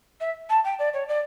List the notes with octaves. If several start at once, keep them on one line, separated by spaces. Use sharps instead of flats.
E5
A5
G5
D5
C#5
D5